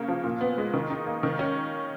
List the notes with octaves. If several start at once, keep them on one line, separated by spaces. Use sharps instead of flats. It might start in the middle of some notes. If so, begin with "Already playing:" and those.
Already playing: C#3 A#3
F3
A#2
B3
G#3
D#3
D#4
A#3
D#3
C#4